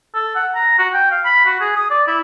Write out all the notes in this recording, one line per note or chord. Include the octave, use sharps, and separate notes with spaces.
A4
F#5
A#5
F#4
G5
F5
B5
F#4
G#4
D#6
D5
E4